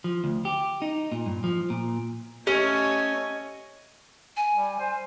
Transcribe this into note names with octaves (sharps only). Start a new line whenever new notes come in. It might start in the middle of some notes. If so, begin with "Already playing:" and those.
F3
D2
G4
D#4
A#2
G2
F3
A#2
A3 C#4 G4 C#5 D#5 G#5
G#5
G3
C5